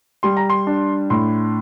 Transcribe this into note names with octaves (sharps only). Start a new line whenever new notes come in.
G3 C6
A#5
C6
D4
A2 C6